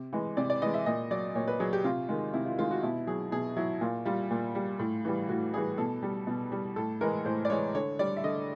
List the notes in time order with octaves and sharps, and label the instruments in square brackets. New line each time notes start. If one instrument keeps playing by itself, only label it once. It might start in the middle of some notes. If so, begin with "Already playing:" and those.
Already playing: [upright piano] C3
E3 G#3
C3 D5
D5
E3 G#3 D#5
E5
A#2 D#5
F#3 D5
A#2 C#5
B4
F#3 G#4
G4
C3 F4
D#3 G#3
C3 E4
F4
D#3 G#3 F4
F#4
B2 E4
F#3 G#4
B2 G#4
F#3 E4
A#2 F4
G3 F4
A#2
G3
A2
E3 G3
A2 F#4
E3 G3 G#4
B2 A4
G3
B2
G3
A2 A4
E3 G#3 A#4
A2 C5
D5
E3 G#3 C#5
D3 C#5
G3 D5
E5
D3 D#5